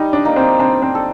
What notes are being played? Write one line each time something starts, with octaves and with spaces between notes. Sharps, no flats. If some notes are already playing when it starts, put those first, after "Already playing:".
Already playing: G3 D#4
D4
A#3 D#4
C4
C4 D4
C4
A4